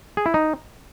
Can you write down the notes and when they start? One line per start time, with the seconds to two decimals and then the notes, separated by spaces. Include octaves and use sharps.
0.17 G#4
0.26 E4
0.34 D#4